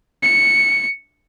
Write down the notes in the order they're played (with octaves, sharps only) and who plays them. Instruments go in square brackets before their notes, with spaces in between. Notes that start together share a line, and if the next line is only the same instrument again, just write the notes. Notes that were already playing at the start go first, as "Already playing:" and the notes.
[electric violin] C#7